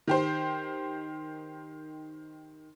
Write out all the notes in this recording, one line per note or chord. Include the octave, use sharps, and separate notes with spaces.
D#3 G4 C5